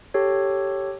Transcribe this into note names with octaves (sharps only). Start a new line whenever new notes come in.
G4 A4 C#5